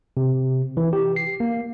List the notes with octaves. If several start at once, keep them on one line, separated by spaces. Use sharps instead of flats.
C3
E3
G4
C7
A#3